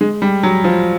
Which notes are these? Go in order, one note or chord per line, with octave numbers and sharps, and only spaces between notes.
G#3
G3
F#3
F3